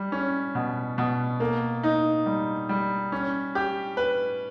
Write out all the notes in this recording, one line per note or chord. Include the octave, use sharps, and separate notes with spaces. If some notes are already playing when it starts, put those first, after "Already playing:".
Already playing: G3
C#4
B2
B2
A#3
D#4
G3
G3
C#4
G4
B4